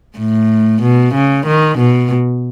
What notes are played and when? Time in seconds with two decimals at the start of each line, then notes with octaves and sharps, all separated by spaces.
0.19 A2
0.82 B2
1.15 C#3
1.47 D#3
1.79 B2